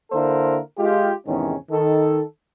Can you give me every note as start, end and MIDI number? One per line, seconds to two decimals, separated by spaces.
0.11 0.58 50
0.11 0.58 58
0.11 0.58 64
0.11 0.58 69
0.11 0.58 70
0.11 0.58 72
0.78 1.11 56
0.78 1.11 65
0.78 1.11 67
1.27 1.54 40
1.27 1.54 44
1.27 1.54 48
1.27 1.54 51
1.27 1.54 61
1.71 2.21 51
1.71 2.21 69